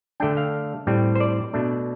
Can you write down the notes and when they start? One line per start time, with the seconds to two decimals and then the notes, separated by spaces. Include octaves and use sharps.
0.20 D3 A3 D4 G5
0.37 F5
0.87 A2 G3 C4
1.15 C5
1.20 D5
1.53 B2 A3 D4